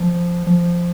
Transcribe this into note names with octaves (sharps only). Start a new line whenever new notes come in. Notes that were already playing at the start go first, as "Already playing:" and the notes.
Already playing: F3
F3